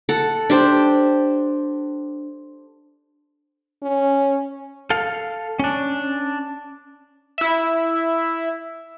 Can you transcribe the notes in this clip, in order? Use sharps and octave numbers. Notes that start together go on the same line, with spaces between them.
A4 F#5
D4 G4 C5
C#4
A4 F5
C#4 D4
E4 E5